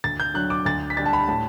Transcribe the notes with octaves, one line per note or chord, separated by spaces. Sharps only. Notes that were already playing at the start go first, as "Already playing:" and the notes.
D2 A6
G6
D3 F#3 F#6
D6
D2 A6
B6
D3 G3 A6
A5
B5
A2 A5